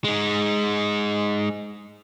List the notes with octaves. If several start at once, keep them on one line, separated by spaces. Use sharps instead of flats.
G#3 D#4